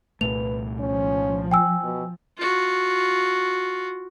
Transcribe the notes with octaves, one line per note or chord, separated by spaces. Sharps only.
C2 A#2 A3 B4 F7
F3 C#4
G5 G#5 E6
B2
F4 F#4